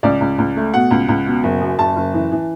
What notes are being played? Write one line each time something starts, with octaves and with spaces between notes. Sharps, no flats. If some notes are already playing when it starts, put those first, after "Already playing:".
C#2 D5
C#2
C#2
A3
B2 F#5
C#2
C#2
B2
F#1
F#2
F#1 A5
F#1
E3
E3